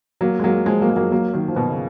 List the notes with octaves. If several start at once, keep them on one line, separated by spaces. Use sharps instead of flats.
F#3 A#3
G#3
F#3 A#3
F3 G#3
F#3 A#3
G#3
F#3 A#3
F#3 A#3
D#3 F#3
F3
B2 D#3
C#3